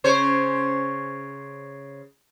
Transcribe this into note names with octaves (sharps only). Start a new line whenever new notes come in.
C#3 C5 C#5